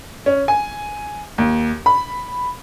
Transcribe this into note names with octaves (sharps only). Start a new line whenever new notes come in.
C#4
G#5
D#2
B5